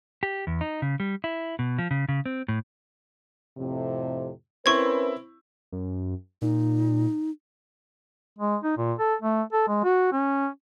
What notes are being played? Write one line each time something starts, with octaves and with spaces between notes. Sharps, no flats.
G4
E2
D#4
C#3
G3
E4
B2
F3
C#3
C#3
C4
A2
F2 A2 C3
C4 C#4 E4 A#4 B4 C#6 G#6
F#2
A#2 D#4
G#3
D#4
A#2
A4
A3
A4
G#3
F#4
C#4